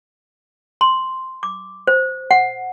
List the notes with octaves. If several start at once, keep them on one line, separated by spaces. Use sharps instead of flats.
C6
D6
C5
F#5